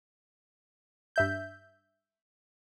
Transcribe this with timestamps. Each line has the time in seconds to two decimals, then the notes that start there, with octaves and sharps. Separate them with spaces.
1.16 G2 E5 G6